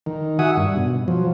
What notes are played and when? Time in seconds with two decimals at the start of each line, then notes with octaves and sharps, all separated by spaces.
0.06 D#3
0.39 F#4 E5 F#5 G#5 D#6
0.57 G2
0.76 B2
1.08 F3 F#3